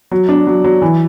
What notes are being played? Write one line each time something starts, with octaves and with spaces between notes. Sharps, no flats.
F#3
D4
F#3
F#3
E3